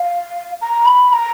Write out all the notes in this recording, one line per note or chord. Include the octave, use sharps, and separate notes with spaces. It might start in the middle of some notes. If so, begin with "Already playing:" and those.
Already playing: F5
A#5
B5
B5
A#5